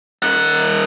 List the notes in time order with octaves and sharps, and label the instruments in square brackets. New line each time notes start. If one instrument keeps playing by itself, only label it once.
[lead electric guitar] D#3 F#5